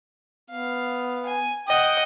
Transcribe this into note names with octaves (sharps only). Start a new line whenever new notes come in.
B3 F5
G#5
D#5 F#5 G5